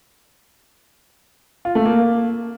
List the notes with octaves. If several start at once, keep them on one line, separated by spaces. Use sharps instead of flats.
F4
A3
A#3